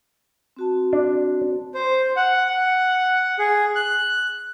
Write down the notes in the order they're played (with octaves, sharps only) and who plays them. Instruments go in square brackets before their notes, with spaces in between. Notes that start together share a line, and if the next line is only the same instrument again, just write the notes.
[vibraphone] C4 F#4 A5
[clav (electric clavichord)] D4
[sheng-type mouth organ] C5
F#5
F#5
G#4
F#6